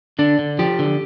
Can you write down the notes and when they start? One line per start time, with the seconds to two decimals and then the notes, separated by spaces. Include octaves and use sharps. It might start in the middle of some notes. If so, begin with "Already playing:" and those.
0.19 D3 D4
0.39 D3
0.59 F3 G4
0.79 D3